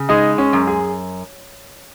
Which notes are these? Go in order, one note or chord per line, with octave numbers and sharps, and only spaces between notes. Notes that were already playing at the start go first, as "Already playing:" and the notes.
Already playing: C#3
G#3 D#4
C#4
F#2
G#4